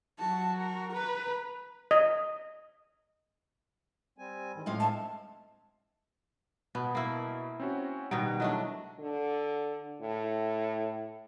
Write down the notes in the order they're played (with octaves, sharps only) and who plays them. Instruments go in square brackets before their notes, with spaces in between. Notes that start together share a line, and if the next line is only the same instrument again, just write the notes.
[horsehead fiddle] F#3 F#4 [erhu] A5
[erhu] A#4
[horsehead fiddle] B4 [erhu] A#5
[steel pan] D#5
[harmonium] G3 C4 G#5
G#2 D#3 E3
[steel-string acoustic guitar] A2 G#3 F5 [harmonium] C4 C#4 F4
[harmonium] C4 D4 E5 [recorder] A5
[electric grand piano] B2 [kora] B3
[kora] A#3 E4
[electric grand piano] C4 C#4 F#4
[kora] B2 D#3 D#4 [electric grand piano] G3 F#5 D7
[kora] F#3 A3 D4 [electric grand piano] E4 D#5
[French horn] D3
A2